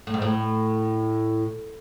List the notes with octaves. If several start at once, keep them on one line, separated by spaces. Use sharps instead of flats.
A2
G#2
A2